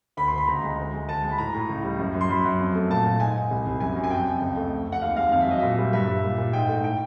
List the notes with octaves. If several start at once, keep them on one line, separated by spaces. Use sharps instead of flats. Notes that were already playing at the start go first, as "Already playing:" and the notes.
D2 B5
C6
D2
B5
C#2 A#5
G#3
D2
G#3
D2 A5
G#3
B5
A2 A#5
A2
C#2
G3
F#2
F#2
C6
F#2 B5
F#2
F2
A3
A#2 A5
A#2
G#2 G#5
G#2
C2
C2
F#2 G#5
F#2
G#5
F2 G5
F2
C#2
A3
F2
F2
F#5
D#2 F5
G#3 F5
F2 F5
E5
F#3 D#5
A#2 E5
G3
G2 E5
G2
A#2
A#2
G#2 G5
A3
A2 G5